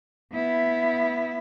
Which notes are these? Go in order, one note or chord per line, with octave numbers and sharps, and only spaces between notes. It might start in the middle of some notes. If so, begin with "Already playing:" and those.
B3 E4